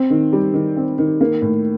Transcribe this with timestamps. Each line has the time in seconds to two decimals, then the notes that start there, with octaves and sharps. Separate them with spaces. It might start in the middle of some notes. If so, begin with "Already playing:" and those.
Already playing: C4
0.10 D#3
0.33 G3
0.54 D#3
0.76 C4
0.98 D#3
1.21 A#3
1.42 A2